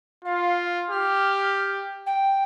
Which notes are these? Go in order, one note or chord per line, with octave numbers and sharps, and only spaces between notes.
F4 F5
G4 F6
G5